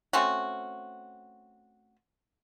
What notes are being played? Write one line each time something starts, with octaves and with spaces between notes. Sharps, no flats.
A3 C4 C#4 F#4